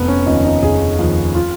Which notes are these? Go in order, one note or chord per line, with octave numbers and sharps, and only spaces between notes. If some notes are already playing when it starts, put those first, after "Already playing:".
Already playing: F1 B3
C#4
D#2 C#3 F3 D#4
D#4
F1 G#4
D#2 C#3 F3
F4